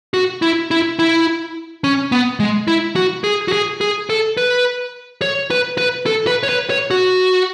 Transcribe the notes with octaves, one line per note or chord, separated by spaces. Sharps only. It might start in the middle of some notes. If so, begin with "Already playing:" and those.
F#4
E4
E4
E4
C#4
B3
G#3
E4
F#4
G#4
F#4
G#4
G#4
A4
B4
C#5
B4
B4
A4
B4
C#5
B4
C#5
F#4